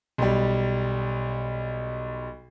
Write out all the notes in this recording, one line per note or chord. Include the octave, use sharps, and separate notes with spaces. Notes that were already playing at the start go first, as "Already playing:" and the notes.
B1 G3